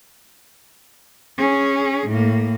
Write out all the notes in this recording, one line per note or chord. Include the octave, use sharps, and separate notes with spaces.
C#4 G#4
A2 A#3